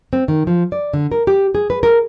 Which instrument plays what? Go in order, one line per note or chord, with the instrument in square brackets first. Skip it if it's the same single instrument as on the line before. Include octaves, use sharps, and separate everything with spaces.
[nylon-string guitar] C4
D#3
F3
D5
D3
A#4
G4
G#4
B4
A#4